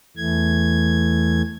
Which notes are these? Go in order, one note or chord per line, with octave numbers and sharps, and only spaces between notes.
E2 E3 A3 G#6